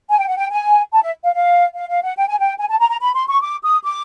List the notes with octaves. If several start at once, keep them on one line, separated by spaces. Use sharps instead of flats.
G#5
G5
F#5
G5
G#5
A5
E5
F5
F5
F5
F5
F#5
G5
G#5
G5
G#5
A5
A#5
A#5
B5
C6
C#6
D6
D#6
D6